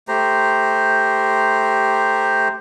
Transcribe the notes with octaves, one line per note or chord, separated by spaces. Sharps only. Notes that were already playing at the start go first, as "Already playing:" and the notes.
A3 G4 C5 A#5